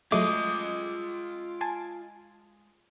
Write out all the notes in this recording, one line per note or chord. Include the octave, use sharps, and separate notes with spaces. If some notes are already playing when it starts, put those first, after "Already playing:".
F#3 G#3 A3 F4 D#5 D6
G#5 A5 C6